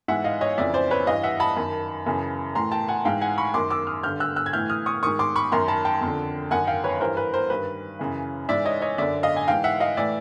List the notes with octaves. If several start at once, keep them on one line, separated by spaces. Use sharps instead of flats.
G#2 E3 E5 F#5
D#5 F5
C#5 D#5
F2 C#3 E3 D5 E5
C5 D5
B4 C#5
G2 E3 D#5 F5
E5 F#5
A5 B5
F#2 D#3
F#2 C#3 E3
A2 E3 A#5 C6
G5 A5
F#5 G#5
G#2 E3 F5 G5
F#5 G#5
B5 C#6
F#2 D#3 C6 D6
D6 E6
D#6 F6
G2 D3 F6 G6
E6 F#6
E6 F#6
G#6
A2 E3 F6 G6
D#6 F6
C#6 D#6
G#2 D#3 C#6 D#6
C6 D6
B5 C#6
F#2 D#3 A#5 C6
A5 B5
G5 A5
F2
D3
F#2 D#3 F#5 G#5
F5 G5
B4 C#5
G2 E3 A#4 C5
B4
A#4 C5
G2 D#3 B4
F#2 C#3 E3
G#2 E3 D5 E5
C#5 D#5
C#5 D#5
F#2 D3 D5 E5
D#5 F5
G#5
G#2 E3 F5 G5
E5 F#5
D#5 F5
A2 E3 D5 E5